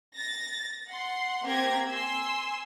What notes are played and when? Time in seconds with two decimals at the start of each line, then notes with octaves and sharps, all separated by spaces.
0.14 A6 A#6
0.88 F#5 C6
1.43 A#3 C4 G4 G#6 A#6
1.89 G#5 C6 E6